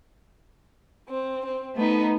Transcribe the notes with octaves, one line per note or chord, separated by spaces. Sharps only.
C4
C4
A3 B3 D#4